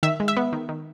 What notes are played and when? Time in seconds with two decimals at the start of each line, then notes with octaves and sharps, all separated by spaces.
0.03 D#3 E5
0.20 G#3
0.28 E5
0.37 B3
0.53 D#3
0.69 D#3